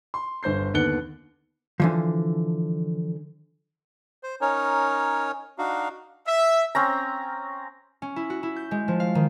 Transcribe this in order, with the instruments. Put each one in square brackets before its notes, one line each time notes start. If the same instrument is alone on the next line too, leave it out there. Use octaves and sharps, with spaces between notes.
[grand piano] C6
G1 C5 G6 C7
D#2 D3 B3 F#6 C#7 G7
[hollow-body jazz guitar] D3 E3 F3
[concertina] C5
C#4 D#4 A#4 C#5
D4 D#4 F#4 F5
[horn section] E5
[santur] C4 C#4 A#5
[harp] C#4
E4
F#4
E4
G6
G#3
F3
F5
D#3